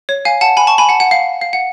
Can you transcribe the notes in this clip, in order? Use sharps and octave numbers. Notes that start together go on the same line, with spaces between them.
C#5
F5 G#5
F#5 A5
G#5 B5
A5 C#6
G#5 B5
F#5 A5
F#5
F5
F5
F#5